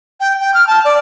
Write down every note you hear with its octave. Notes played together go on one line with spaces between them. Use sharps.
G5
G5
F6
A5
D5